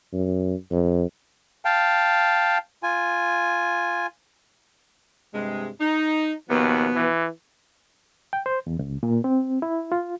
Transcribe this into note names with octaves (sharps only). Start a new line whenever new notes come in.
F#2
F2
F5 G5 A5
F4 G#5
G2 C3 G#3
D#4
D#2 B2 F3 B3
E3
G5
C5
E2
C#2
A#2
C4
E4
F4